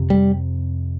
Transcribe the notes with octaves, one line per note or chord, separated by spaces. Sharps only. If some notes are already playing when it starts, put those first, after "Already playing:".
Already playing: F2 C3
G3